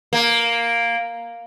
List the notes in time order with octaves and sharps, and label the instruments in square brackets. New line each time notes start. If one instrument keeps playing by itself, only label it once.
[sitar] A#3